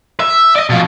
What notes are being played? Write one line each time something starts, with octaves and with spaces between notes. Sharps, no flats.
E5
D5 D#5
B2 F3